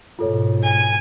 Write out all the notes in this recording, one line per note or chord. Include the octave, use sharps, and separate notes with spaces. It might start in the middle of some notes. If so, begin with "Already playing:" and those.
G#2 B2 F4 A4 C#5
G#5